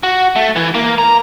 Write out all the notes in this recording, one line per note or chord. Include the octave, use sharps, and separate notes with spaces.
F#4
A3
E3
A#3
A#5